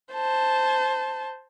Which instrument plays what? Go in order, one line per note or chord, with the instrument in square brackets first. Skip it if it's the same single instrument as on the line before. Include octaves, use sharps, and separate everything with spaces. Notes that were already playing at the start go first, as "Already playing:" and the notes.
[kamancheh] C5 A5